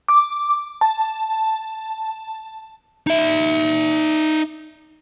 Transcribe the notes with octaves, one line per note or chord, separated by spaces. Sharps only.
D6
A5
D#4 E5